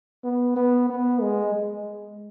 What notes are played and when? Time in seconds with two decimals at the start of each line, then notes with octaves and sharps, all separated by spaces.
0.24 B3
0.57 B3
0.90 B3
1.21 G#3
1.55 G#3